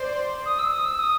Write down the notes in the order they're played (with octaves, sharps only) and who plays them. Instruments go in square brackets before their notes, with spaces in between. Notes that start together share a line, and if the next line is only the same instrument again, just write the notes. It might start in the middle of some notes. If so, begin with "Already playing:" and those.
Already playing: [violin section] C5 D5
[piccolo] D#6
E6
D#6
E6
D#6